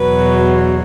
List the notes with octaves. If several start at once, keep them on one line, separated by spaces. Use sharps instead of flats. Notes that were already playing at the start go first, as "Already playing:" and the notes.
Already playing: E2 B2 F#3 B4